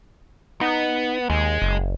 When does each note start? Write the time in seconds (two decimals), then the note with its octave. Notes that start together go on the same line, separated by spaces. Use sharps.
0.61 B3 D#4
1.30 D#2 G#3
1.62 F#1